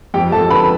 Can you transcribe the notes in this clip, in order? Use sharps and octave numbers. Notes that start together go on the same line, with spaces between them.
F2 G4 G5
F2 A4 A5
D3 B4 B5